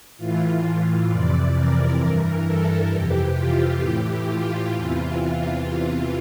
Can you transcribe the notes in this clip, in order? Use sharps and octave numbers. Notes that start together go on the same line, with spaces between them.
A2 E3 F4
F2 C3 E3 D5
A#4
G2 E3
A4
F2 C3 E3 G4
F4
A2 E3 G4
F4
E2 C3 E3